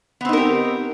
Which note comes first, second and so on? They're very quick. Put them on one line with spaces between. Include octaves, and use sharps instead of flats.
B3 C4 D#4 A#4 G4